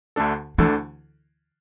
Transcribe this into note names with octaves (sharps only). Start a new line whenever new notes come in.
D2 D3 A3 D4 A4
D2 D3 E3 A3 D4 A4